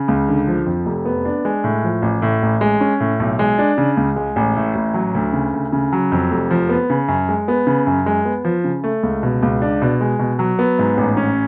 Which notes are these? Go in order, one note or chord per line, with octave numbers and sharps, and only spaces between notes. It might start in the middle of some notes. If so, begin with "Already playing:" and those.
Already playing: C#3
C#2
D3
F3
F2
F1
B3
D4
G#3
A2
F3
A1
A2
A1
G#3
C#4
A2
B1
G#3
D4
C#3
C#2
G#3
A1
A2
A1
F#3
D2
C#3
D2
C#3
F#3
F2
F1
F3
B3
C#3
F#2
G#3
B3
C#3
F#2
G#3
B3
F3
C#3
A3
C#2
B2
C#2
D4
B2
G#3
B2
F#3
B3
G#2
A1
C#4